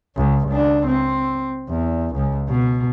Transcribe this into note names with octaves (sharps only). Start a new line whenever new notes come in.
C#2
C#2 D4
C4
E2
C#2
B2